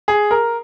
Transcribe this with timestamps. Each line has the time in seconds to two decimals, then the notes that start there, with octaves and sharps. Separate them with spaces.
0.08 G#4
0.31 A#4